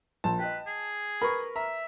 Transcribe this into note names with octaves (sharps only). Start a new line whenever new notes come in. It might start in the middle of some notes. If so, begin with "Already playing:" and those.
A#1 A5
B4 D#5 G5
G#4
A#4 B4 B5 C#6
E5 A#5